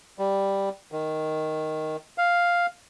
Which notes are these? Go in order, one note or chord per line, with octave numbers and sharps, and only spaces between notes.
G3
D#3
F5